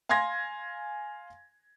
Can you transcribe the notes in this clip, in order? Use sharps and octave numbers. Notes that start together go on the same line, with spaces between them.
F5 G#5 C6 G#6 A#6